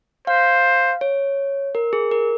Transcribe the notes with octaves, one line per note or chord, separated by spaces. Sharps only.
C5 F5
C#5
A#4
G#4
A#4